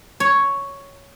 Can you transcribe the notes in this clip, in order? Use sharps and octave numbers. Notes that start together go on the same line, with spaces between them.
C#5